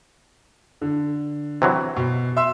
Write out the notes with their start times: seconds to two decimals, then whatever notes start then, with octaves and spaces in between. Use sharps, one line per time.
0.81 D3
1.62 C3 E3 F#3
1.96 B2
2.37 E5 C6 E6